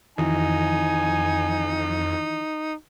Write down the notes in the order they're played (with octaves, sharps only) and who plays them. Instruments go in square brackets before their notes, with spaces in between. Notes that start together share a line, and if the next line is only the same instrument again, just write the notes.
[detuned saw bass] F2 [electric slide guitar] D#3 E3 F#4 [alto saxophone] D#4 [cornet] G#5